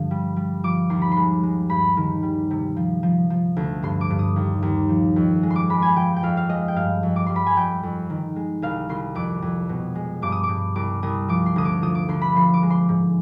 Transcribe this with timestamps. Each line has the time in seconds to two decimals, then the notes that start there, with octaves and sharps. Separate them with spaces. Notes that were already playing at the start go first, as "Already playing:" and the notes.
Already playing: G2 D3 F3
0.11 G3
0.36 G3
0.64 F3 D6
0.90 D#2 C6
1.02 B5
1.12 G#3 C6
1.43 G#3
1.69 G2 B5
1.97 D#3
2.23 G3
2.51 C3
2.76 F3
3.03 F3
3.30 F3
3.56 D2
3.83 G2 C6
4.01 D6
4.10 G2
4.19 D#6
4.36 D#2
4.62 D#2
4.89 F3
5.16 F2
5.43 G#3
5.50 C6
5.56 D6
5.69 G#3 B5
5.82 G#5
5.96 F3 G5
6.16 G5
6.23 F2 F5
6.37 F5
6.49 G#3 D#5
6.68 G5
6.76 G2 F5
7.03 F2
7.16 D6
7.26 G3 C6
7.36 B5
7.46 G#5
7.56 F2 G5
7.83 F2
8.10 D#3
8.36 G#3
8.62 C2 F5
8.89 C2 C6
9.15 F2 D6
9.42 F2
9.69 B2
9.95 G#3
10.22 G2 D6
10.32 D#6
10.43 D6
10.49 G2
10.76 C2 D6
11.03 C2 D#6
11.28 F3 D6
11.46 C6
11.56 D2 D#6
11.65 D6
11.82 F3 D#6
11.95 D6
12.09 D2 C6
12.22 B5
12.36 F3 C6
12.54 D6
12.63 G#3
12.70 C6
12.89 G#2